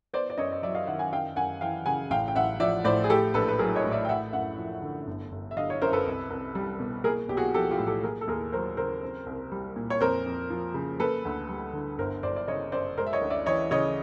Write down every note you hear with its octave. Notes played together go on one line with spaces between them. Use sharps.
B3 C5 D5
D5
F#2 C#5 D#5
D#5
F#3 D5 E5
D#5 F5
D#3 E5 F#5
F#5 G#5
F#2 F5 G5
F#2 F#5 G#5
E3 F5 G5
C#3 F#5 G#5
A1 F5 G5
G5
A1 E5 F#5
F3 D5 E5
A2 C5 D5
G#4
A3 G4 A4
A#1 A4 B4
B4
F#3 G#4 A#4
C#5 D#5
A2
D5 E5
G5
A3 E5 F#5
F#2 E5 F#5
F3
D3
G1
G1
E5
D3 D#5 F5
C#5
F#2 A#4 C5
A4 B4
C2
C2
G3
B2
A#3 G#4 A#4
B1 G4
F#4 G#4
F3 G4 A4
F4 G4
A2
G4 A4
A#3 G#4 A#4
A4
D#2 G#4 A#4
F#3 A#4 C5
C#3 A#4 C5
C4
C2
G3
A#2
C#5
F2 A#4 C5
F2
F3
C#3
A#3 A4 B4
D2
G3
D3
G1 A#4 C5
G1 C5 D5
D5
C#3 C#5 D#5
F#2 C5 D5
G#3 A#4 C5
E5
C#5 D#5
D2
D5 E5
E3 C#5 D#5
C#3 C#5 D#5